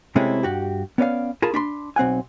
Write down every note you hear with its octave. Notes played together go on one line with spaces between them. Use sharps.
C3 G#3 A3 C4 C#4 E4
G2 F#4 G4
B3 C#4 D5 F5
F4 G#4 A#4 A5 B5
D4 B5 C6
B1 C4 F#5 G#5